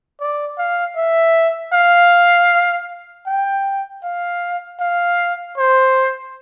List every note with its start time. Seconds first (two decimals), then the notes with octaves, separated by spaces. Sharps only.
0.20 D5
0.59 F5
0.97 E5
1.73 F5
3.27 G5
4.04 F5
4.81 F5
5.58 C5